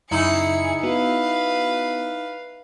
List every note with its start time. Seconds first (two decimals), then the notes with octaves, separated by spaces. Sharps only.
0.11 F#2 C#3 D#4 E4 G#4 C#7
0.83 B3 F#4 B4 F5